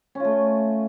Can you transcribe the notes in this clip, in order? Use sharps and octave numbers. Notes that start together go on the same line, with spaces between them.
A3 C#4 F4